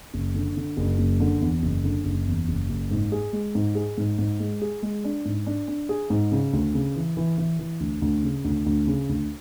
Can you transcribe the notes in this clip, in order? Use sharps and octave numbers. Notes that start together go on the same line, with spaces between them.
F#1
D3
D3
F#1
F#1
D3
E2
F#1
D3
F#1
E2
F#1
F#1
G#2
G#4
G#3
G#2
G#4
G#2
G#2
G#3
G#4
G#3
D4
G#2
D4
D4
G#4
G#2
C#3
D2
C#3
E3
E3
E3
E3
D2
D2
C#3
D2
D2
C#3
D2